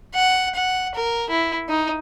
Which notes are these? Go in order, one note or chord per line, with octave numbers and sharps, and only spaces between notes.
F#5
F#5
A#4
E4
D#4